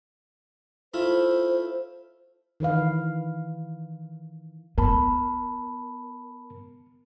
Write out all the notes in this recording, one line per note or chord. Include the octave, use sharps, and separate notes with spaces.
A3 E4 F4 C5
D#3 E3 B4 F5
B3 A#4 A5 B5